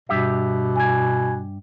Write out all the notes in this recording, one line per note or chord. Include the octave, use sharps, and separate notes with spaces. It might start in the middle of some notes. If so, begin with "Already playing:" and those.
G2 B2 G4 E5
G#5 G#6